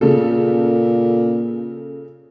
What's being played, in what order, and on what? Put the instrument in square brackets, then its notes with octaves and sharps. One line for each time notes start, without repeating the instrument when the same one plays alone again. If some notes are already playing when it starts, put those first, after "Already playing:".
[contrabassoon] A#2 [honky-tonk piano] C#3 A4